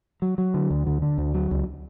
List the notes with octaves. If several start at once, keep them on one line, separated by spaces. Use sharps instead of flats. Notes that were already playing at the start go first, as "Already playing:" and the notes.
F#3
F#3
D3
D2
D3
D3
D2
F#3
C#2